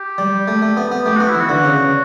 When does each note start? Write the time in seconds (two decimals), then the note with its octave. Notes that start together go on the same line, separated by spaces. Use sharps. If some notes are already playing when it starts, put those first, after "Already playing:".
Already playing: G4
0.18 G3
0.48 A3
0.62 A3
0.77 B3
0.92 B3
1.06 A3 G4
1.17 B3 F#4
1.29 E4
1.35 E3
1.40 F#4
1.49 D3
1.64 C#3